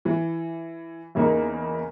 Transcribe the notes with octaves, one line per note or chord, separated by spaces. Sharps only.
E3
E2 C#3 A#3 D#4